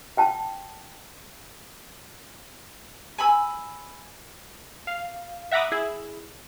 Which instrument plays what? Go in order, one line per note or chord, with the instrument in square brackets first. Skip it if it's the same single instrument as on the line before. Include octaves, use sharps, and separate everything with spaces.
[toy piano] F#5 G5 A5
[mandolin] G#5 B5 E6
[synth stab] F5
E5 F#5 A#5 B5 D6 D#6
E4 G#4